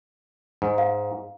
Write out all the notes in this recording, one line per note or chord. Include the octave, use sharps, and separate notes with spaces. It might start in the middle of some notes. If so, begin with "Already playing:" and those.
G#2
F5